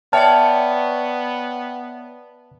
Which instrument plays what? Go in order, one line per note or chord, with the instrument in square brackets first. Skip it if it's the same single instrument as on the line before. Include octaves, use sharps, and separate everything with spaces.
[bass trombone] B3 [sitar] C#5 D5 [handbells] E5 G5 F6 [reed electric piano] A5